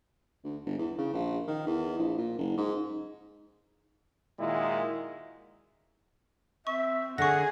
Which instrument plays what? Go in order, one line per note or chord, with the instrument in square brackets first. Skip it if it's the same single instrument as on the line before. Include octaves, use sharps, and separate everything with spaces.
[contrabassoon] D2
G1
E2
C#3
A#1
D#3
E2
A#1
A#2
F#1
G#2
[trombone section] A#2 D#3 G#3 E4 F#4
[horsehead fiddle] C4 [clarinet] E5 [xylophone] C#6
[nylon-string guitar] D3 [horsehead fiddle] G#4 [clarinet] F#5 [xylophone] C#6 A#6